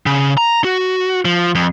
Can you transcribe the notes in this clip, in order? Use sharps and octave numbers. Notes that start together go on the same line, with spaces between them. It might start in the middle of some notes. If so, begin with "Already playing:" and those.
C#3
A#5
F#4
F3
F2